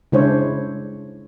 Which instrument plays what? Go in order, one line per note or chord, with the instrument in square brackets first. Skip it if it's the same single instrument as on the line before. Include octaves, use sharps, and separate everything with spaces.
[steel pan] C#3 G#3 D4 E4 C5 C#5